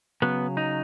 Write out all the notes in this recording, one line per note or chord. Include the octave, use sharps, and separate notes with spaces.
C#3 F#3 B3
D#4